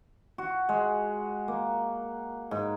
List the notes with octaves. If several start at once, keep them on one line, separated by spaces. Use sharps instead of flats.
F#4
G#3
A#3
G#2